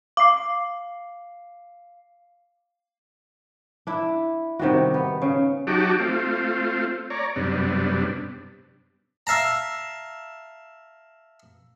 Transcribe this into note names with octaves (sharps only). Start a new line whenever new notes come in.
F5 D6 C7
D4 E4
C3 D#3 G3 F#4
B3
C#3
F#3 D#4 F#4 G4 A5 D6
A3 C4 F4
C#5 D5 A#5
F#2 C3 G3 B3 D4
E5 F5 A5 A#5